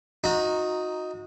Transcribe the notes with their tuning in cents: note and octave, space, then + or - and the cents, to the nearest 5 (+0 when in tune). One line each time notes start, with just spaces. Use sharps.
D#4 +5 F#4 -30 A#5 +0